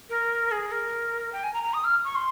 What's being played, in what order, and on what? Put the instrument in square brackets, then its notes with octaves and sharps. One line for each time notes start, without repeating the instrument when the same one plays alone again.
[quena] A#4
G#4
A#4
G5
G#5
A#5
A#5
D#6
F6
C#6
C6